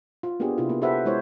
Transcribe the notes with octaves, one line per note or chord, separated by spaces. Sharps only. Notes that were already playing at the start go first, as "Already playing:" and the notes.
F4
A#3 B3 D4 G4 G#4
C3 E4 F4
A#3 B3
G4 A4 B4 C5 E5 F#5
G#3 E4 C5 C#5